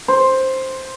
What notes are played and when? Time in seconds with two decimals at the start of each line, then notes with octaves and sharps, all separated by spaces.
0.08 C5